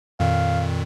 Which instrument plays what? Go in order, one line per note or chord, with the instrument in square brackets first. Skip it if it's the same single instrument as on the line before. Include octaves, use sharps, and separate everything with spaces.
[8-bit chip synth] F2 A#2 D#3 [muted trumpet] F5